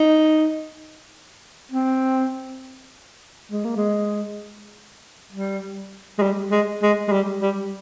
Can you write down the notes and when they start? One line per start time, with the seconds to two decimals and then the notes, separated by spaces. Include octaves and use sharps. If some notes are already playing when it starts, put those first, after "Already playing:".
Already playing: D#4
1.72 C4
3.52 G#3
3.65 A#3
3.76 G#3
5.32 G3
6.18 G#3
6.22 G3
6.52 G#3
6.83 G#3
7.08 G#3
7.12 G3
7.42 G3